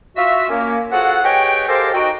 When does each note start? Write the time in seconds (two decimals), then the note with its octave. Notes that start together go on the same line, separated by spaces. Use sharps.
0.17 F4 F#4 E5
0.50 A#3 C#4
0.92 F4 F#4 G#4 A4 C5 F#5
1.24 G4 G#4 B4 C#5 D#5 G5
1.68 G#3 F4 G4 A4 A#4 C5
1.93 D#4 F#4 G5